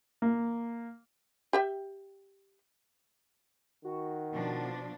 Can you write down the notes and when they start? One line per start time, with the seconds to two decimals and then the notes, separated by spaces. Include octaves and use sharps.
0.22 A#3
1.53 G4 E5 G5
3.85 D#3 F#4
4.34 B2 F3 D4